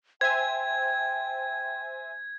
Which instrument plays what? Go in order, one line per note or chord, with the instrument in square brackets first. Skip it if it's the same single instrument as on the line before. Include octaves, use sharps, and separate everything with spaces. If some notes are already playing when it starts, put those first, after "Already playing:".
[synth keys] C5 E5 G#5 [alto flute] G5 [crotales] G#6